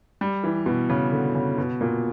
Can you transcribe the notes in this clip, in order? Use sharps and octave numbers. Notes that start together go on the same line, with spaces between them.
G3
E3
B2
C#3
D3
C#3
B2
A#2